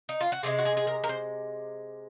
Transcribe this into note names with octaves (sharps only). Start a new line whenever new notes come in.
D#4
F4
F#4
C3 F3 G#3 G#4
F#4
G#4
G#4
A#4
A#4
C5